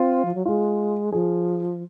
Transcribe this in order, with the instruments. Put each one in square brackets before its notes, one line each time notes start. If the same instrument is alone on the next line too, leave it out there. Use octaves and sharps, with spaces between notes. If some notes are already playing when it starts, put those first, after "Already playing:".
Already playing: [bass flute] C4 [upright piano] F4
[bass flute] F3
F#3
[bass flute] G#3 [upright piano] F4
[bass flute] F3 [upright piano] G#4